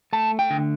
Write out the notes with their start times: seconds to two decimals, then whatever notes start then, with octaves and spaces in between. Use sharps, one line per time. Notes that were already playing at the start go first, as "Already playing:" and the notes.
0.13 A3 A5
0.39 G5
0.50 D3